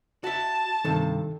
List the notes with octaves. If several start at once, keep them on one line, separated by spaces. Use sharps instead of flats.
F#4 E5 A5
G2 C3 D#3 A4